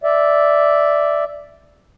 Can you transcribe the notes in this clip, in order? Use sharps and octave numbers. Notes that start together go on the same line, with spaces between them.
D5 E5